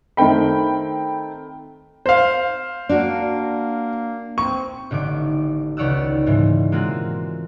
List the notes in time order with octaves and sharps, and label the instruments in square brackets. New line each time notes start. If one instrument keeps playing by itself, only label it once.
[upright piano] D#3 A3 C4 G5 B5
C5 F5
[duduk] A#3 [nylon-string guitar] D4 F#4
[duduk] C4 [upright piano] C#6
[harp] A1 D3 D#3 D6
C#2 D#3 C#5 D5 F#5 E6
G#2 B2 E3
G#3 A#3 C4 F4 F#4